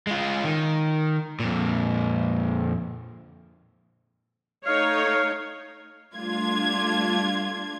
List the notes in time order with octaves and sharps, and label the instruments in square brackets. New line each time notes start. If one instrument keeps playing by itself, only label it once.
[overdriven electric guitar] G#3 F4
D#3
F2 A#2
[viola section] A3 D#4 C#5 [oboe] F5
[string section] G3 A3 D4 F4 G#6